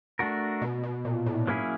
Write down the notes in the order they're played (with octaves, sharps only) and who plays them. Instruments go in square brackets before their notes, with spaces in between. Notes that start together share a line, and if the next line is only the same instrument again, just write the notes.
[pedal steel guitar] A3 D4 F#4 A#4
[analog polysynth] B2
B2
A#2
A2
[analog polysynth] G#2 [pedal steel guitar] F#3 A#3 C#4 E4 G#4